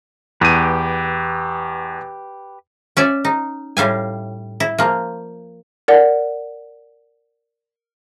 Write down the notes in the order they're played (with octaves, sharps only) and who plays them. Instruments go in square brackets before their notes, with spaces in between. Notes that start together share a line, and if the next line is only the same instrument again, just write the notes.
[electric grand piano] E2 D#7 [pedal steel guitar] G4 B4
[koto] C#4 D5 E5
D#4
A2 G3 F5 G#5
E4
F3 A#3
[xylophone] A#4 D5 F#5